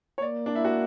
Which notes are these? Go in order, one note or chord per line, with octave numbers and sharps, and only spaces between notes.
C#5
A#3 D5
D4
E4
F#4